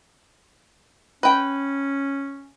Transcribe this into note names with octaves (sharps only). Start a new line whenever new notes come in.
C#4 B4 G5